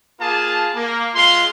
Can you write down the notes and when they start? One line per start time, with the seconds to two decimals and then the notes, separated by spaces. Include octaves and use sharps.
0.21 A#3 F4 G#4 A5
0.75 A#3
1.15 G#3 F4 C6